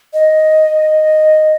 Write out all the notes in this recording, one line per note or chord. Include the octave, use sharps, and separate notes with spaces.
D#5